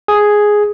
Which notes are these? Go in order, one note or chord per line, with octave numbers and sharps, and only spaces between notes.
G#4